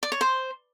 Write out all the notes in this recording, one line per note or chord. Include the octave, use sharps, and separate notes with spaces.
D5
C#5
C5